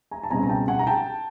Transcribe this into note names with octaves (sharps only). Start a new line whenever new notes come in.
G#5 A#5
A5
C#2 B2 G3 C4 G#5 A#5
A#5
G5 A5
F#5 G#5
A#5
G5 A5